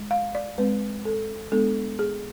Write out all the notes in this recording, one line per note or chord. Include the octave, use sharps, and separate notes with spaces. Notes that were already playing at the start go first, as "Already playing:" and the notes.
Already playing: G#3
F5
D5
G#3 C4 B4
A4
G#3 B3 D4 A4
G#4